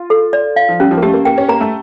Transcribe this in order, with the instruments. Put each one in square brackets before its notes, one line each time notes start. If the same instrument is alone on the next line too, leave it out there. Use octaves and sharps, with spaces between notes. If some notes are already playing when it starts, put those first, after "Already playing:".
Already playing: [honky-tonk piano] F4
[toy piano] A4
D5
F5
[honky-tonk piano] F3
[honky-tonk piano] G3 [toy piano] C#4
[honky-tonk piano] F3
A#3
[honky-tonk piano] A3 [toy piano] G4
[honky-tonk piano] A#3
[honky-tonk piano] A#3 [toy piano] G5
[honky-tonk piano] C#4
[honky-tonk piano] A#3 [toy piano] A#5
[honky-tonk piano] A3